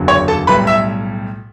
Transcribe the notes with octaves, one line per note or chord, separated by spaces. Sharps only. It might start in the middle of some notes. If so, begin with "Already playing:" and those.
Already playing: F#1 E2 D3 F#3
C#5 C#6
A4 A5
B1 A2 G3 B4 B5
E5 E6